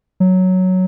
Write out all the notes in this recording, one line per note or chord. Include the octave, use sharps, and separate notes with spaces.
F#3